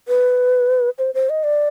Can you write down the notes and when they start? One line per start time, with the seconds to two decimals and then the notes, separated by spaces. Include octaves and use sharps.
0.08 B4
0.98 C5
1.15 C5
1.30 D#5
1.44 D5